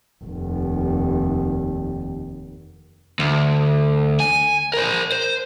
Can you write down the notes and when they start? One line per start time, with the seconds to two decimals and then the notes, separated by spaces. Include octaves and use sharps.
0.24 F1 D#2
3.19 D2
4.20 G#5
4.74 A#4 C5
5.12 C5